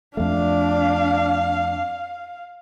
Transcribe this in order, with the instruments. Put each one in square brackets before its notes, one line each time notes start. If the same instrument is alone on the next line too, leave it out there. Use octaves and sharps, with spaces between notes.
[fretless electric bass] F2 A3 [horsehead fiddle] D4 [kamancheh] F5